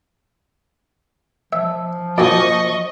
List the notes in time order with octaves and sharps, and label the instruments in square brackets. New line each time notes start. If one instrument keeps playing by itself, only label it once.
[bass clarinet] F3 [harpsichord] E5
[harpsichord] F#2 A#2 F#4 [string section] D#5 C#6